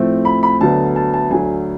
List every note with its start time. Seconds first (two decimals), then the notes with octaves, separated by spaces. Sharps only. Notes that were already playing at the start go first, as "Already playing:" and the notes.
Already playing: A2 F3 A3 C4
0.25 B5
0.43 B5
0.61 D2 D3 F#3 B3 A5
0.96 A5
1.14 A5
1.31 D2 D3 F#3 G#5